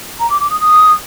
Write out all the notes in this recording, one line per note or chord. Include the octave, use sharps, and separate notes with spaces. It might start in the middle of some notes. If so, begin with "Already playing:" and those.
A#5
D6
D6
D#6
D#6